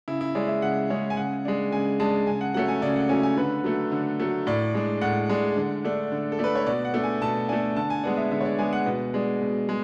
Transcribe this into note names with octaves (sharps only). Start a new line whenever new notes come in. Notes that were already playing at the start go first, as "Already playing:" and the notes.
C#3 E4
E4
G#3 C#4 D5
E5
C#3 F#5
G#3 C#4
G#5
C#3 F#5
G#3 D4
C#3 G#5
G#3 D4 A5
C#3 G#5
F#5
F#3 A3 C#4 F#5
G#5
C#3 D5
F#5
F#3 A3 C#4 G#5
G#5
D3 B4
F#3 A3
D3
F#3 A3
A2 D5
G#3 D4
A2 F#5
G#3 D4
D3
A3 D4
D3
A4
A3 D4 B4
C#5
B2 D5
F#5
A3 D4
G#5
B2 A5
A3 D4 G#5
D3 A5
G#5
G#3 B3 D4 F#5
E5
D3 E5
C#5
D5
G#3 B3 D4 G#5
F#5
B2
G#3 D4
B2
G#3